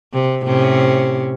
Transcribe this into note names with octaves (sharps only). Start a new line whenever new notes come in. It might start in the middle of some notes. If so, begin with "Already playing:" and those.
C3
A2 C3 C#4